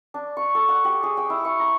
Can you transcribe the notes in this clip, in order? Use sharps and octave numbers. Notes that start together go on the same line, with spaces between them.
D4
C#6
A4
F#5
G4
G#4
G5
E4
C#6
A#5